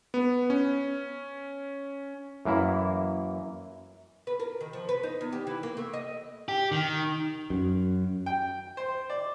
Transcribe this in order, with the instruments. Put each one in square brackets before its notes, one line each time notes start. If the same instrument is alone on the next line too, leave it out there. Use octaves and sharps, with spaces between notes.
[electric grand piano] B3
C#4
[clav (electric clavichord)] F#2 E3 A#3 E4
[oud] B4
A#4
D#3
F3
B4
D#4
E2
G4
E3
A#3
A3
D#5
[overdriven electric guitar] G4
D#3
[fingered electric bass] F#2
[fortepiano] G5
C5
D5